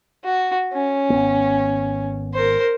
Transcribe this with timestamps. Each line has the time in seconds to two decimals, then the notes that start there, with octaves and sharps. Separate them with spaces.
0.24 F#4
0.73 C#4
1.10 G#1 E2 B3
2.34 A#4 C5